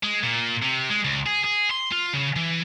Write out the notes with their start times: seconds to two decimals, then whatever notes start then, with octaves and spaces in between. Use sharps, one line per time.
0.03 G#3
0.23 A#2
0.62 C3
0.90 G#3
1.05 C#2
1.26 G#4
1.45 G#4
1.71 C6
1.92 F4
2.13 C#3
2.36 E3